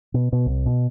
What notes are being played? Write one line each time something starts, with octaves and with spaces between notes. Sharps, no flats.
B2
B2
C2
B2